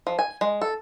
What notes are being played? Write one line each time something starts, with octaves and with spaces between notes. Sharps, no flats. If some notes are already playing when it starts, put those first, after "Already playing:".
F3
G#5
G#3
A4